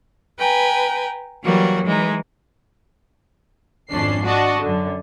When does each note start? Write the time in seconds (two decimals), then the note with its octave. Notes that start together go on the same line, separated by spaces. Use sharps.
0.37 B4 G5 G#5 A#5
1.43 E3 F#3 G3 A#3 F#4
1.84 E3 G#3 D#4
3.91 G#1 F2 C#4 D4 C7
4.25 D4 F#4 D#5 A5
4.61 F#2 D3